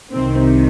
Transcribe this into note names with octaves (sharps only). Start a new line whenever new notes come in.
C2 C3 D#3 C4